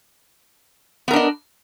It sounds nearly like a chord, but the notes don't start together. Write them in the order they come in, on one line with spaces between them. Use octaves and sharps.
B3 A#4 D4 D#5